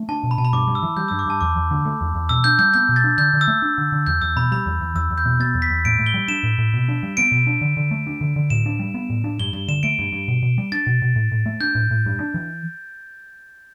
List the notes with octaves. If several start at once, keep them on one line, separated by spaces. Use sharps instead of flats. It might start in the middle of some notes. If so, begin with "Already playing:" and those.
Already playing: A3
D4 A5
B2
B5
B2 A5
B5
G2 D6
G2
E6
E3
G3 G6
E6
G2
D6
G2 A5
E2 D6
E2
D3
A3
E2
E2
B2 E6
D4 G6
G3 G6
B3 G6
B2
A6
D4
D3 G6
D3
E6
A3
D4
D3
D3
E2 G6
E2 E6
B2 B5
G3 B5
E2
E2
E2 E6
E2
G6
B2
B3 A6
E2
B6
E2
A2 D7
A2
G7
G3
D4 E7
A2
A2
B2
D4
G3
B3 D7
B2
D4
D3
D3
A3
D4
D3
D3
A2 E7
D4
G3
B3
A2
D4
G2 G7
G2 G7
D3 E7
A3 D7
G2
G2
B2
B2
G3
D4 A6
B2
B2
A2
A2
A3
D4 G6
A2
A2
G2
D4
E3